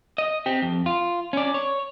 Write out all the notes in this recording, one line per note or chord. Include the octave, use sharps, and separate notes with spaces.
D#5
C4 G4
F2
F4
C#4 D5
C#5